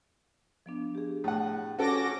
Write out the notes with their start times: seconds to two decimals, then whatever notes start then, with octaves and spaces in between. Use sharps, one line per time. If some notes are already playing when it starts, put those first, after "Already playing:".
0.66 F3 B3 D4
0.95 G4 G#4
1.24 A2 F#5
1.79 C#4 F#4 A4 D6 A#6